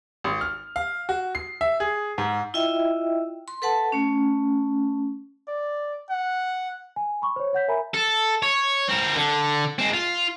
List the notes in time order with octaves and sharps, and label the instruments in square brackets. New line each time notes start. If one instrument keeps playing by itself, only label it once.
[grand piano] G#1
F6
F5
F#4
C7
E5
G#4
G#2
[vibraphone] E4 F4 D#5 E5 G5
C6
A4 B4 F#5 A5
A3 C#4
[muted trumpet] D5
F#5
[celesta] G#5
B5 C#6 D6
C5 C#5
C#5 F#5 G6 B6
A#4 E5 G#5 A#5 B5
[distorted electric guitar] A4
C#5
C4 A#4
D3
G#3 C4
F4